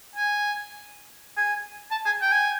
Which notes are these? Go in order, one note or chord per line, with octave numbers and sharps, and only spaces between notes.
G#5
G#5
A5
G#5
G5
G#5